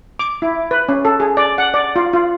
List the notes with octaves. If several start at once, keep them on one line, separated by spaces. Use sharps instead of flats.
D6
E4
B4
C#4
A4
G#4
D5
F#5
D5
F4
F4